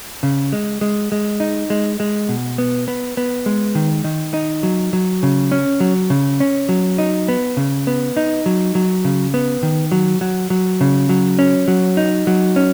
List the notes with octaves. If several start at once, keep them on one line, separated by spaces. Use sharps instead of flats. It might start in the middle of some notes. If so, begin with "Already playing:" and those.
C#3
G#3
G#3
G#3
D#4
G#3
G#3
B2
B3
B3
B3
G#3
D#3
D#3
D#4
F#3
F#3
C#3
C#4
F#3
C#3
C#4
F#3
D#4
B3
C#3
B3
D#4
F#3
F#3
C#3
B3
D#3
F#3
F#3
F#3
C#3
F#3
C#4
F#3
D#4
F#3
C#4